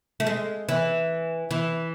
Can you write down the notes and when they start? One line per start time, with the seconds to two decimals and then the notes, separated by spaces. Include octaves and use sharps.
0.20 A3
0.27 G#3
0.69 E3
1.51 E3